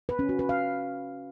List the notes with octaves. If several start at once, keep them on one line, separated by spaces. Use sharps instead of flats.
B4
C#4
F#4
B4
F5